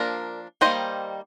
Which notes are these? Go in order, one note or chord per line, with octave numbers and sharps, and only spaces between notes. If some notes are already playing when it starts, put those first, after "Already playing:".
Already playing: F3 A#3 D4 A#4 D5
D#3 G3 A#3 C5 D#5